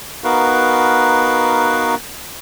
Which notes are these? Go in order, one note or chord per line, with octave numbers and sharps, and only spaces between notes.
B3 D#4 F#4 A#4 B4 F5